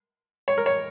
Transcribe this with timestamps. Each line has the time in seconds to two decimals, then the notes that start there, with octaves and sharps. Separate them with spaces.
0.48 C#5
0.57 A#4
0.66 C#5